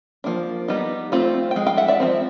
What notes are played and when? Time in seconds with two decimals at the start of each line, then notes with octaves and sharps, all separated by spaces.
0.24 F3 A#3 D4
0.68 G3 B3 D#4
1.12 A3 C4 F4
1.51 G5
1.56 F3 G#3
1.67 F5 G5
1.77 E5 F#5
1.88 D5 E5
2.00 F3 G#3 C4